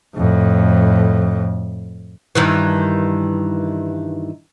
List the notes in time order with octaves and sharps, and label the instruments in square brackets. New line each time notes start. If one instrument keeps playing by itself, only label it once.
[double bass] F2 A2
[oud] G2 D#3 E3